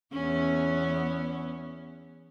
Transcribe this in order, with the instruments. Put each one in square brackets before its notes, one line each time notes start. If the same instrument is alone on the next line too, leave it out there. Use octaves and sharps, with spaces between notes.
[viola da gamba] E2 B3 C#4